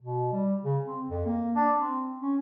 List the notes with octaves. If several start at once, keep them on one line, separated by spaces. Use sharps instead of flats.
B2
G3
C#3
C4
F2
A#3
D4
C4
C#4